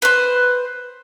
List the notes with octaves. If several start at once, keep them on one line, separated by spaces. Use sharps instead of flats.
B4 C5